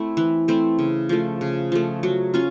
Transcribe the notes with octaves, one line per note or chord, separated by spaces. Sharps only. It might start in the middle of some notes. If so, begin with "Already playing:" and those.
Already playing: A3 C4 E4
E3
A3 C4 E4
C#3
F3 A3
C#3
F3 A3
F#3
C#4 F4